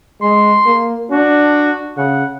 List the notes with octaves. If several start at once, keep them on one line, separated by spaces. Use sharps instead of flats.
G#3 C6
A#3
D4 F#4
C#3 F#5